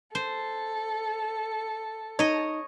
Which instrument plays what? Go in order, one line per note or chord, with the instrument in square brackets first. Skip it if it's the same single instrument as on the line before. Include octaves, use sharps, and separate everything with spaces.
[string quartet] A4 [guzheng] C5
[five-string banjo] D#4 [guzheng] C#5 D#5